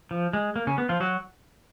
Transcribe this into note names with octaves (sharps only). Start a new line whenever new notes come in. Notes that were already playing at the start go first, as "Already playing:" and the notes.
F3
G#3
A#3
C#3 C#4
B3
F3 F4
F#3 F#4